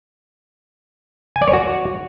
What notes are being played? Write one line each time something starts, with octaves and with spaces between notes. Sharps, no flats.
G#5
D5
C#5
F#4